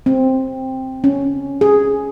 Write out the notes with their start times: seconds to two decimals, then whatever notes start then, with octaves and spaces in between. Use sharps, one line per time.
0.06 C4
1.04 C#4
1.61 G#4